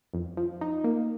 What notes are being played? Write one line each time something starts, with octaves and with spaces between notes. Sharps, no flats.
F2
F3
D#4
A#3